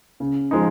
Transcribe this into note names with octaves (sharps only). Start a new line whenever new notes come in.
C#3
F3 G#3 D#4